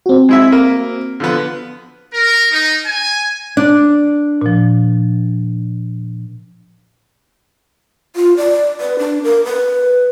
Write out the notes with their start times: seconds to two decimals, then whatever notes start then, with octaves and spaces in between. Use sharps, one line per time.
0.06 C4 F#4
0.29 G#3 E4 E5
0.52 A#3
1.20 D3 F3 B3
2.13 A#4
2.51 D#4
2.85 G#5
3.57 D4
4.42 A#2 F3
8.16 F4
8.37 D5
8.80 B4
8.99 D4
9.23 A#4
9.45 B4